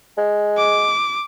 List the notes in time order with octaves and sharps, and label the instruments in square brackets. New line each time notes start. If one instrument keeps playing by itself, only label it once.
[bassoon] G#3
[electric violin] D6